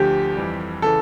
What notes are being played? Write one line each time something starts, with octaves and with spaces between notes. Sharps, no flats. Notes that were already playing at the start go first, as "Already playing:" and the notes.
Already playing: D2 D3 F3 G4
F2 E3 G3
C#3 E3 A4